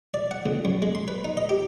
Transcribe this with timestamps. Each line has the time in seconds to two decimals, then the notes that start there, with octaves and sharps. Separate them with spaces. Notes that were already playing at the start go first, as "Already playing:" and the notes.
0.14 D5
0.31 F#5
0.46 C#2
0.65 F#2
0.82 G#3
0.95 C6
1.08 B4
1.25 D#4
1.37 D#5
1.49 G4